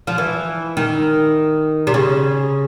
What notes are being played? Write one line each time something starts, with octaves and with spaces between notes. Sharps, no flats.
F3
E3
D#3
C3
C#3